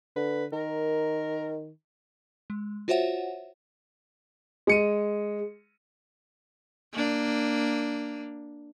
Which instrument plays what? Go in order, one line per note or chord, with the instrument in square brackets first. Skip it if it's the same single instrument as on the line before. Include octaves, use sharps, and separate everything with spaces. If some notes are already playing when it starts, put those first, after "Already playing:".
[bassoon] D3 [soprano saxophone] B4
[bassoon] D#3 [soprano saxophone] A#4
[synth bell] G#3
F4 F#4 C5 C#5 E5 F#5
[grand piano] G#3 C#7 D#7
[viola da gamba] A#3 D4